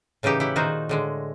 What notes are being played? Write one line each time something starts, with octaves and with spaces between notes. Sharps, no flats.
A2 C#3 E3 D#4 G4
E4 G4 F#5
A#2 D#3 D#4 F#4 C5
A2 D3 G#3